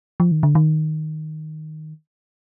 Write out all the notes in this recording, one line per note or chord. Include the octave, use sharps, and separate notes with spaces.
F3
D#3
D3
D#3